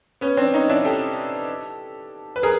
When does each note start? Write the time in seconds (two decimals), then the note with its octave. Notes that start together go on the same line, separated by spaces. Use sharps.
0.21 B3 C#4
0.37 C4 D4
0.54 C#4 D#4
0.69 D4 E4
0.85 G4 A4
2.36 B4
2.43 G#4 A#4